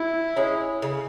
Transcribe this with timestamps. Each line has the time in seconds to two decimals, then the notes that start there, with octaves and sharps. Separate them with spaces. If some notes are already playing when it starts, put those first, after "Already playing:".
Already playing: E4
0.36 G#3 C#4
0.82 C#3